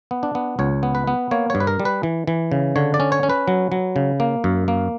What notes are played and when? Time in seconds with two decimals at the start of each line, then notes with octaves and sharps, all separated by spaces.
0.11 B3
0.23 D4
0.35 B3
0.59 C#2 C#5
0.83 B3
0.95 B4
1.07 B3
1.31 A#3 C#5
1.50 G2 C#5
1.60 B4
1.67 A#4
1.80 G3
1.85 B4
2.03 E3
2.27 E3
2.52 C#3
2.76 D3 C#5
2.94 D5
3.00 C#4
3.12 C#5
3.23 C#4
3.30 B4
3.48 F#3
3.72 F#3
3.96 C#3
4.20 A#3
4.44 F#2
4.68 A#3